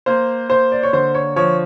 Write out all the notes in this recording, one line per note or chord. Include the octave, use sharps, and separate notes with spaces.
A#3 C5
A#3 C5
D5
C#5
D3 C5
C#5
F3 C#5